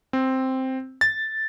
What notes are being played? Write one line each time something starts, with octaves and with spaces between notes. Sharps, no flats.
C4
A6